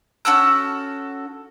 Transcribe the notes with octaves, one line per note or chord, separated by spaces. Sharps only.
C#4 F#4 A4 E6